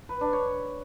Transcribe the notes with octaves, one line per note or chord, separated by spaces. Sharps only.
B4
D4
C#5